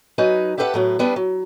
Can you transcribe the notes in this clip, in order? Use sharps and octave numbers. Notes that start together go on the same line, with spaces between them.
F#3 D#4 B4 G#5
E4 G4 A4 B4 E5 F#5
A2 F#3 B3
G3 B3 D4 B4
F#3